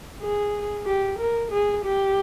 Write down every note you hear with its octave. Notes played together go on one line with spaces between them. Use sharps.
G#4
G4
A#4
G#4
G4